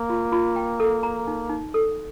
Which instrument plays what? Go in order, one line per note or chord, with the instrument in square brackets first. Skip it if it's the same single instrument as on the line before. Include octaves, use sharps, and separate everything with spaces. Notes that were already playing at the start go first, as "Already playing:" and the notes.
Already playing: [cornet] A#3
[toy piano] F4
F4
G5
A4
A#5
D#4
D#4
A4